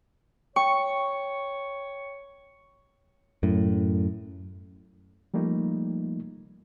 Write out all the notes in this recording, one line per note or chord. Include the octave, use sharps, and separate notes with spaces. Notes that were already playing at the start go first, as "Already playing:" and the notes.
C#5 G5 C#6
F#2 A2
F3 G3 A3 A#3 D#4